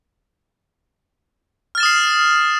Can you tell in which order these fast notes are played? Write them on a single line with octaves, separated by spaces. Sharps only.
F6 A6 E7 D#6 C7